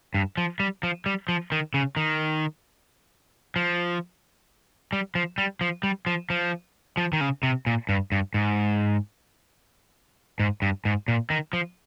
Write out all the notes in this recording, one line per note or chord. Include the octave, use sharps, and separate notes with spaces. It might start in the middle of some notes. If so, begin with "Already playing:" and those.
G2
F3
G3
F3
G3
F3
D#3
C#3
D#3
F3
G3
F3
G3
F3
G3
F3
F3
F3
D#3
C#3
C3
A#2
G2
G2
G#2
G#2
G2
G#2
A#2
D#3
F3